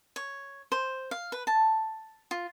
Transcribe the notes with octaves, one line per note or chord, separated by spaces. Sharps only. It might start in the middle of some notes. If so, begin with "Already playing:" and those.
C#5
C5
F5
B4
A5
F4